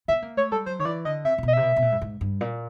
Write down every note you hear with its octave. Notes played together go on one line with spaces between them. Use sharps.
B3 E5
A#3
A3 C#5
G3 A4
F#3 C5
D#3 C#5
E3 D5
D3 D#5
C3 E5
C3
B2 D#5
C3 E5
B2
B2
A#2
G2
G#2
G2
A#2